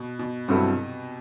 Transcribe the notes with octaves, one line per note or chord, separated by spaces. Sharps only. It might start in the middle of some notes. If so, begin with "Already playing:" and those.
Already playing: B2
B2
G2 C3 F#3 C4 E4 A4